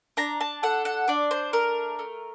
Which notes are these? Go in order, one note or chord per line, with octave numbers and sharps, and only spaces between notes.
D4 A#5
A5
A4 F#5
F#5
D4 D5
C5
A3 A#4
A3